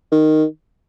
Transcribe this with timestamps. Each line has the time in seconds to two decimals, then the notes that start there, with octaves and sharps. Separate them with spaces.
0.12 D#3